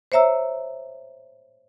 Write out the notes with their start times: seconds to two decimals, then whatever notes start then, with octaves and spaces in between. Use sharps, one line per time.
0.12 C5 C#5 E5 A#5 E6